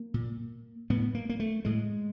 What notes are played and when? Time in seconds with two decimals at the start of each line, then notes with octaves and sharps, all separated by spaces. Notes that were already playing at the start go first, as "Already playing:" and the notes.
Already playing: A#3
0.14 A#2
0.90 A2 B3
1.15 A#3
1.29 A#3
1.40 A3
1.65 A2 G#3